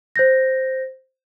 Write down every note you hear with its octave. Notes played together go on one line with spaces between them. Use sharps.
C5 G6 A#6